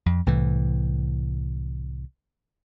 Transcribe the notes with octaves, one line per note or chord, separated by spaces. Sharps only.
F2
C2 A2 E3